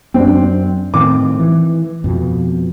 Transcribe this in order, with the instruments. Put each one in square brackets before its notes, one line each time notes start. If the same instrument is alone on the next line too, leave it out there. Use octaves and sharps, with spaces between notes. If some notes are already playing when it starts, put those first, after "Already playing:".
[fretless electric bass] F#2 [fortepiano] C4 D4
[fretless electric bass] A2 D#3 C4 [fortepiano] D6
[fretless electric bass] E3
F2 B2